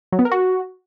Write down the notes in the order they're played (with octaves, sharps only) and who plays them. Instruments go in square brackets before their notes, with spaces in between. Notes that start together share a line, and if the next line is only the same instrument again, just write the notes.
[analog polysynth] F#3
B3
A#4
F#4